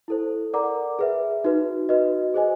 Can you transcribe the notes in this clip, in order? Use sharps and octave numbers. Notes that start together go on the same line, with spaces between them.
E4 A4 C5
A#4 D5 F#5 A#5 D6
G#4 B4 E5
D#4 F#4 B4
F#4 B4 D#5
G#4 C5 D#5 G#5